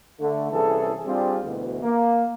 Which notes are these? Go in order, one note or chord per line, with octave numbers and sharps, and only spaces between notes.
D3 A3
C2 E3 C#4 G#4 A4
G3 C4 D4 F4 G4 G#4
D2 B2 E3
A#3